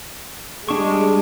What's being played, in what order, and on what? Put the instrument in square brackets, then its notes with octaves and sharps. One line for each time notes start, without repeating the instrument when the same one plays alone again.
[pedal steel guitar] G3 D4 C#6 [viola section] G#3